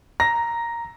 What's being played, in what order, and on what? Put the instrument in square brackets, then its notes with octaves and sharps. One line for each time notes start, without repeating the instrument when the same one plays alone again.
[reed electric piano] A#5 [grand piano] A#6